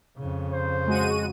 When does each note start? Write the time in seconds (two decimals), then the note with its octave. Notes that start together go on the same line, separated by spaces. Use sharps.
0.18 F2 C#3
0.53 C5
0.87 G#3 F#4 D#7